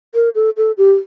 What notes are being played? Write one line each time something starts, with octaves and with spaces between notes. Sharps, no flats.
A#4
A4
A4
G4